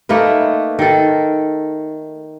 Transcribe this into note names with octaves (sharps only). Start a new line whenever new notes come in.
A3 A#3 D#4 B4
D#3 A4